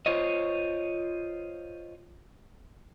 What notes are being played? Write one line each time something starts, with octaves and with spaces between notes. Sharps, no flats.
F4 C5 C#5 D#5